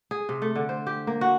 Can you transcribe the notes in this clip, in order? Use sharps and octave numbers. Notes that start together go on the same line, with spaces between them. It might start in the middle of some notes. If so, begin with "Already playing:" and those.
G#4
C3
A3
D3
C5
G4
A#3
F#4